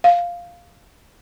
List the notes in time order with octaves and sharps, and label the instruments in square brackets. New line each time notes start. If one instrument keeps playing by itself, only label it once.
[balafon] F5